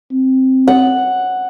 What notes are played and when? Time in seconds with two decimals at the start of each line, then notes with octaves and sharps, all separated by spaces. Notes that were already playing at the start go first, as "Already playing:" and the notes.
0.12 C4
0.68 F#5